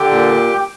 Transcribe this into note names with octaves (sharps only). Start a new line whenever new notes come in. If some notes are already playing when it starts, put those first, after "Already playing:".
Already playing: D3 G4 G5
A#2